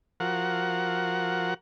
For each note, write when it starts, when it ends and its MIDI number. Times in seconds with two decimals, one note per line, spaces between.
0.20 1.54 53
0.20 1.54 66
0.20 1.54 70
0.20 1.54 78